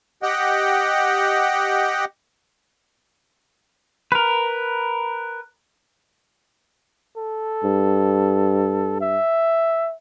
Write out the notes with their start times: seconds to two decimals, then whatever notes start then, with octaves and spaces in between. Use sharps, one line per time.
0.23 G4 D#5 F#5 G5
4.12 A#4 B4
7.17 A4
7.65 G2
9.01 E5